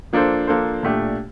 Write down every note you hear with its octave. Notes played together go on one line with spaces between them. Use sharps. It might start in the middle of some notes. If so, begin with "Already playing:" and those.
F3 A#3 D4 A4 C5
F3 A#3 D4 A4 C5
A#2 A3 D4 G4